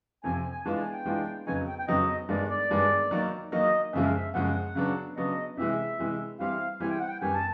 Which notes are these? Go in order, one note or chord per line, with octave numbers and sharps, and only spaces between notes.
F2 C3 F3 G#5
G#5
G#5
E3 G#3 B3 D4 F4 A5
G#5
G5
E3 G#3 B3 D4 F4
F2 C#3 F#3 B3 D#4 G#5
G5
G5
F2 C#3 F#3 B3 D#4 D#5
G2 D#3 G#3 B3 D5
D5
G2 D#3 G#3 B3
D#3 F#3 A#3 D#4
D#3 F#3 A#3 D#4 D#5
F#2 C#3 F3 G#3 E5
F5
E5
F#2 C#3 F3 G#3 F#5
C#3 F#3 B3 D4
C#3 F#3 B3 D4 D#5
C3 E3 G#3 E5
C3 E3 G#3
E3 G3 C4 E4 F5
E3 G3 C4 E4 G#5
G5
F#5
G5
F#2 D#3 G3 B3 G#5
A5